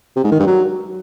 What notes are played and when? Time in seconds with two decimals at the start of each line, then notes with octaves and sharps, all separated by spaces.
0.16 C3
0.24 G#2
0.31 D#3
0.39 G2
0.47 F#3